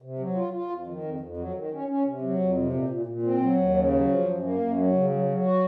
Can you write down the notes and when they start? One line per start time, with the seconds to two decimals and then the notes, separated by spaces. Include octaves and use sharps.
0.02 C3
0.19 F#3
0.35 F4
0.53 F4
0.70 F2
0.87 D#3
1.04 F2
1.20 F2
1.37 F#3
1.54 D#3
1.71 C#4
1.88 C#4
2.05 C3
2.21 F#3
2.39 F2
2.56 C3
2.73 A#2
2.89 A#2
3.06 A#2
3.23 C4
3.40 F#3
3.58 D#2
3.74 C#3
3.91 F#3
4.08 F3
4.25 F#2
4.42 A#3
4.59 F#2
4.75 F#3
4.93 C#3
5.10 F#3
5.26 F#3
5.43 F#4